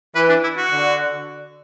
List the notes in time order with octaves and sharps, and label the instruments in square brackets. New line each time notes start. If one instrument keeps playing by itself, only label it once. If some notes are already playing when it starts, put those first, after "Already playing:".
[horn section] E3 [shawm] B4
[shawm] D4
E4
F#4
[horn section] D3